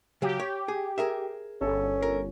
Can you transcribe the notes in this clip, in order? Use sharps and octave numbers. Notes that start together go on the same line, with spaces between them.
C#3 F#3 G4
C#5
G#4
G#4 A#4 E5
G1 C#4 A4
A#4